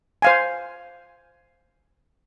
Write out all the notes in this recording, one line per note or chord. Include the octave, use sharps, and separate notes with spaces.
C5 F5 G#5